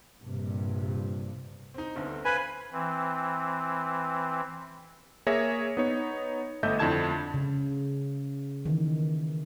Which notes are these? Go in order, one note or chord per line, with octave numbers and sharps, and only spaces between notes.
A#1 G2 C3
C4 D#4
G1 D2 C4
B4 C5 F5 G#5 F#7
E3 C4
A#3 G#4 C#5 E5 A#6
B3 D#4 C#5
G1 A3 D#5 E5 G6
F2 D3 E4 A5 G#6 E7
C#3
D#3 E3